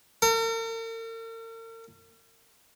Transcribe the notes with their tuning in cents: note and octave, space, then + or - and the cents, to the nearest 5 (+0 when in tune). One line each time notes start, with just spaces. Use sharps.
A#4 -45